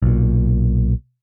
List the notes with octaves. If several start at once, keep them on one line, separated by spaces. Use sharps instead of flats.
B1 A#2